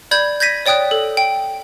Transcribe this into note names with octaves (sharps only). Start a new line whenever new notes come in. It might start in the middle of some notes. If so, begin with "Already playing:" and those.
D5 B5 G6 G#6
G6 G#6 A#6 B6 D#7
C#5 D5 G5 D#6 F#6
A4
G5